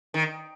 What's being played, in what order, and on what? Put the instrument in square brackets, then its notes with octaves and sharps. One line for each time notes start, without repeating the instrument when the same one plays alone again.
[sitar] D#3